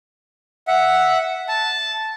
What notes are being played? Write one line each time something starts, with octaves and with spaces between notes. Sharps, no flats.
E5 F#5
A5